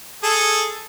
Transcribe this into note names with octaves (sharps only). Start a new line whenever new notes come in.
G#4 A4